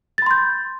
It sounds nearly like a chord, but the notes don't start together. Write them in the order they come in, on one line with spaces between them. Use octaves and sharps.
A6 B5 C6 G6